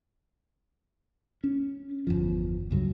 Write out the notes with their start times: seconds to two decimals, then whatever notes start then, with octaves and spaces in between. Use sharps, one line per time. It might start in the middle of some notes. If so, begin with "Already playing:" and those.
1.44 C#4
2.07 G1 E2 F3
2.71 C#2 G2 F#3